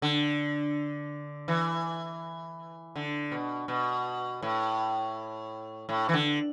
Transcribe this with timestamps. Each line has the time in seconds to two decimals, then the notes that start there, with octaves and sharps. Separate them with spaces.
0.02 D3
1.48 E3
2.96 D3
3.31 B2
3.68 B2
4.42 A2
5.89 A2
6.09 E3
6.14 D3